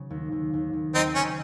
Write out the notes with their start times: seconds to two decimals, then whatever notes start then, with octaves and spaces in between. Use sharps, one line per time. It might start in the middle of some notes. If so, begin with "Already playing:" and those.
Already playing: C#3 F#3
0.10 D#2
0.32 D#2
0.53 D#2
0.73 D#2
0.95 F#3 C4 D#4
1.15 C#3 C#4